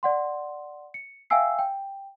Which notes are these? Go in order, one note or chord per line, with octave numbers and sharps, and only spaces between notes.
D5 F#5 C6
C#7
E5 F5 G5 G#5 E6 C7
G5